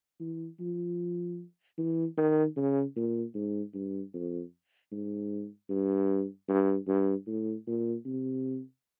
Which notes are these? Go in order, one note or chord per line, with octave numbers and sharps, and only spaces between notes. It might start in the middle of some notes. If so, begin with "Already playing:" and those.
E3
F3
E3
D#3
C#3
A#2
G#2
G2
F2
G#2
G2
G2
G2
A2
A#2
C3